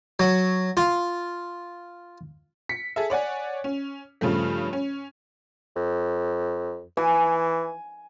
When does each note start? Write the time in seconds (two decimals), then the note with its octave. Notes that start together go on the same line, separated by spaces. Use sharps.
0.20 F#3
0.77 F4
2.69 B6 C#7
2.96 G#4 A4 E5
3.10 C#5 D5 F#5 G#5
3.64 C#4
4.21 G2 C#3 F3 A3
4.73 C#4
5.76 F2
6.97 E3 G#5